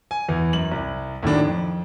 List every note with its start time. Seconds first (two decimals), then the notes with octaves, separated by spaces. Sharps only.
0.11 G#5
0.29 E2 E3
0.53 F#2 F#7
0.72 C2
1.23 D#2 A2 D#3 F#3 D4
1.45 F2